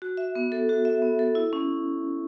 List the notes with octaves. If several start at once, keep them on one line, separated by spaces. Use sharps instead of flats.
F#4
E5
B3
A4
F#4
E5
B3
A4
E4
C#4